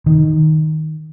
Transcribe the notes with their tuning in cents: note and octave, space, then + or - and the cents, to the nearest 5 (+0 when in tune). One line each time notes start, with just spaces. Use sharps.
D#3 +5